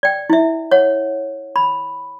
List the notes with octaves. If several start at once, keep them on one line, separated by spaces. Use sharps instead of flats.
D5 G5
E4 E5
C#5 F#5
B5